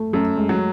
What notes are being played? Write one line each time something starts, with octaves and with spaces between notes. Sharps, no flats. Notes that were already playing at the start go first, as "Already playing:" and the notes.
Already playing: A3
F#2 A3
G#3
F#3